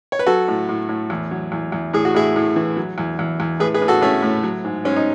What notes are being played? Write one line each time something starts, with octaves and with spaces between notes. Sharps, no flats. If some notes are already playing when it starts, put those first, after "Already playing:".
C#5
B4
F#3 F#4 A4
A2
A2
A2
E2
F#3
E2
E2
A2 G#4
F#4
A2 E4 G#4
A2
E3
F#3
E2
E2
E2
A2 G#4 B4
G#4 B4
A2
F#4 A4
A2 A3 C#4
A2
F#3
G#2
G#2 C#4
D#4